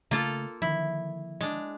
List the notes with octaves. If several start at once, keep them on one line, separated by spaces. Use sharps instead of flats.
C#3 A3 A#3 F4 A4
D3 D#3 F3 E4
G#3 D4